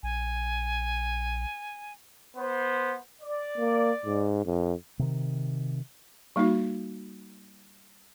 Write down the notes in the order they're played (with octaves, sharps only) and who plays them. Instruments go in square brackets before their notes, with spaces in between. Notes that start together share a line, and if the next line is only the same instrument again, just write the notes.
[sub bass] A#1 [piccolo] G#5
[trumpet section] B3 C5
D5
[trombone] A#3
G#2
F2
[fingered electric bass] C3 D#3
[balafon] G3 A#3 D#4 F#4